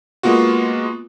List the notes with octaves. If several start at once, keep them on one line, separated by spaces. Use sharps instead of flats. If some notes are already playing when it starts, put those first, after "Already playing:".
G#3 A#3 B3 F4 F#4